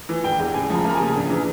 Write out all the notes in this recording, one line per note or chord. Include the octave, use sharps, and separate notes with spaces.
E3
E1 G5
E2
C#2 G#5
F3 A#5
A#3
A#5
G#5
C#3
A#1
E3